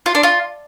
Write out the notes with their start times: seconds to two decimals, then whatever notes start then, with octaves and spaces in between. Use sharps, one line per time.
0.06 F4
0.15 D4
0.23 F4